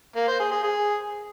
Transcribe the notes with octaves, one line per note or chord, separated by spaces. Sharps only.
A#3
C5
G#4
G#4
G#4